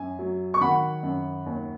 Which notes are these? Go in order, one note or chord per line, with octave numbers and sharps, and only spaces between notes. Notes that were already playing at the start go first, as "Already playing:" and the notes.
Already playing: F#2 G#5
F#3
C#6
D#3 F#5 B5
F#2
D#2